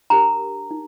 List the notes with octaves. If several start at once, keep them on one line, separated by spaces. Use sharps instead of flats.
D4 G4 A#4 A#5
D#4